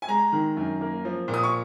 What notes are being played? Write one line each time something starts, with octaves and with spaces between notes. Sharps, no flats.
G#5
G#3 A#5
D#3
F#2
A#3
F3
A#2
D#6
C#6